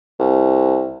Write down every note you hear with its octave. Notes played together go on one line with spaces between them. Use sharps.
C2